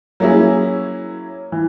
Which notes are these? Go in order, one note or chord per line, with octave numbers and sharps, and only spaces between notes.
F#3 A#3 C#4 E4 G#4
E3